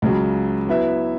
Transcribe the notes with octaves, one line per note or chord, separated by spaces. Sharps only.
C#2 C#3 F#3
F#3 B3 E4 B4 E5